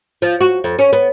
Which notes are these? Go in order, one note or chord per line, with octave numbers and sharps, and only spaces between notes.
F3
F#4
F2
C#4
B3